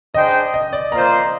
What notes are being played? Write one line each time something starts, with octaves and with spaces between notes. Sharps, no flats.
D4 G#4 C5 D#5 G5
D#5
D5
A#3 F4 C5 A#5